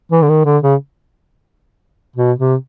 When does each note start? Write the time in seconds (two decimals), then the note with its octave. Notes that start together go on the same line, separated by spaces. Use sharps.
0.12 E3
0.22 D3
0.29 D#3
0.45 D3
0.63 C#3
2.16 B2
2.39 C3